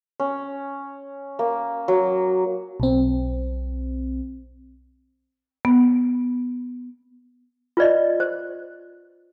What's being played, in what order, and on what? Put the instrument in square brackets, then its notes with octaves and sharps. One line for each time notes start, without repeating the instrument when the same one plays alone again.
[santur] C#4
A#3
F#3
[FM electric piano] B1 C4
[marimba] B3
[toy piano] F4 B4 D5 D#5
C5